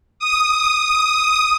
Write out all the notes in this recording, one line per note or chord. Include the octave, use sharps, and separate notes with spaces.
D#6